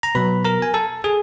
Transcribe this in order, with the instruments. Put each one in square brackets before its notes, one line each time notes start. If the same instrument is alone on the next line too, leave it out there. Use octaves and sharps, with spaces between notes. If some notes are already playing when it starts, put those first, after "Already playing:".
[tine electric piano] A#5
B2 F#3 B4 B5
A#4 A#5
G#5
A4 A5
G#4 G#5